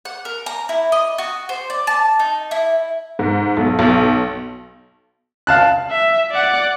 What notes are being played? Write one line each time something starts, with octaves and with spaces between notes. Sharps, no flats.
F#5
A#4
A#5
E4
D#5
F#4
C5
D5
A5
D#4
E4
G#2
B1
B1
F5 A5 F#6
E5
D5 F#5